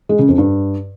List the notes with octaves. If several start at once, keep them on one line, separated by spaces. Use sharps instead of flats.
G#3
C#3
F2
G2